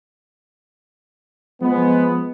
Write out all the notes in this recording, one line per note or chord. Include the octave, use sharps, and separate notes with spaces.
F3 G#3 B3